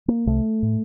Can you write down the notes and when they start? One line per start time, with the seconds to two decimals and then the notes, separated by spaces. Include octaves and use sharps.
0.08 A#3
0.26 C2 C3 A3
0.62 A2